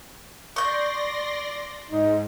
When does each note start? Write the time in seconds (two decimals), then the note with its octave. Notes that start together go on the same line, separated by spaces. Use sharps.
0.56 D5 C6 C#6 G6 A#6
1.90 G#2 D#4